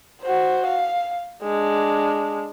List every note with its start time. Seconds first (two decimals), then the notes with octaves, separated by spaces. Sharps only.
0.22 F#4 C5
0.67 F5
1.43 G#3 D4